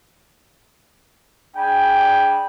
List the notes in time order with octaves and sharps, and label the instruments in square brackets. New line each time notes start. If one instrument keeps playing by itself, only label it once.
[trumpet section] D4 G#4 G5 G#5 B5